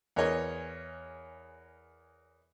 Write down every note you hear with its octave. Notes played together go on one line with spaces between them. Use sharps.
E2 G#4 A#4 C#5 D#5 G#5